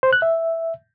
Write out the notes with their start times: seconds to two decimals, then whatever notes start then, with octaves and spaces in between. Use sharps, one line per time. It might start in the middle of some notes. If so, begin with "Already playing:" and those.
0.03 C5
0.13 F#6
0.22 E5